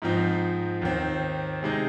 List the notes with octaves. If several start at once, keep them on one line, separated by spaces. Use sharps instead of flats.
G#2 F3 C4 D#4
D#2 D#3 C4 D#4
C3 G#3 D#4